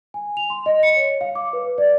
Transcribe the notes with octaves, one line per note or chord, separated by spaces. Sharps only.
G#5
F7
C6
D#5
C#7
C#5
F5
D6
B4
D5